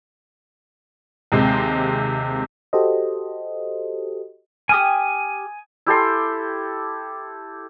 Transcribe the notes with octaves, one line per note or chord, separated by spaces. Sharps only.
D#2 C3 G#3 C4
F#4 G4 A4 C5 D#5
G4 G#5 D#6 F6
E4 G4 A4 C6